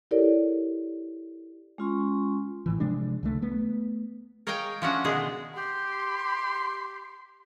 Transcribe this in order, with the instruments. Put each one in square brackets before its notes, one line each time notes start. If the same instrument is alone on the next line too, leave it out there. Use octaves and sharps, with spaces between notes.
[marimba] E4 G4 A4 A#4 C#5 D5
[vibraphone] G#3 C#4 F4 C6 C#6
[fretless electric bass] A1 A2 E3
C3 F3 G#3 D4
C#2 D3 A3
A3 B3
[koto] A#4 C#5 D#5 F5 G5 G#5
F3 A3 C#4 D4 F#4 F#5
B2 D3 D#3 G#3 B3 G#4
[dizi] G4 [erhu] C6